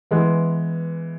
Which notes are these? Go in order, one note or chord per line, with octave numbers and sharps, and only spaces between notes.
E3 G#3 B3